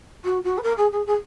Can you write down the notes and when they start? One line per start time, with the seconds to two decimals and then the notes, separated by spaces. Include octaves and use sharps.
0.24 F#4
0.44 F#4
0.57 B4
0.62 A#4
0.77 G#4
0.92 G#4
1.06 G#4